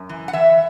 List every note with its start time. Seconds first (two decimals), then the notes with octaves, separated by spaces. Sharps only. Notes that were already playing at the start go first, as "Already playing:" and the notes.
Already playing: F#2
0.09 E3
0.28 F#5
0.33 E3 E5